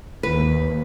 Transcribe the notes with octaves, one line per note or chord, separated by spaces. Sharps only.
D#2 B4